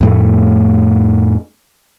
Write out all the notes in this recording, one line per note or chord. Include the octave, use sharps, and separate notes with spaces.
F2 A2 A3